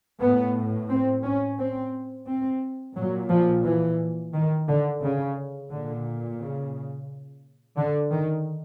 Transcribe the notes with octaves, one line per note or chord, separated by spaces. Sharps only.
A2 B3
C4
C#4
C4
C4
A#2 F#3
F3
E3
D#3
D3
C#3
A#2 D3
C#3
D3
D#3